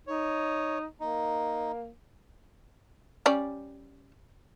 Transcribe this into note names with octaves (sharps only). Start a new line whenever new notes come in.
D#4 C#5
A#3 D#4
G3 C#4 D5